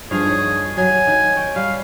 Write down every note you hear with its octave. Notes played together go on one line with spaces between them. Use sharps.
G2 F3 G#4 F5
D#3 C#5
F#3 G#5
D#3
C#5 G5
G3 F5